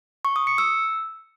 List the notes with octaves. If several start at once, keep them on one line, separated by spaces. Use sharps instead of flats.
C#6
D#6
C#7
E6